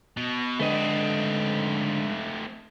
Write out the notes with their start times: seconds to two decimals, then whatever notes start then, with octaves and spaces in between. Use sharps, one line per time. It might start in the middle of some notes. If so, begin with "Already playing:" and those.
0.17 B2
0.59 G#2 D3 A3 C4 B4 D#5